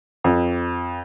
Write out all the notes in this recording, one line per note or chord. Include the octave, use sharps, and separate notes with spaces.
F2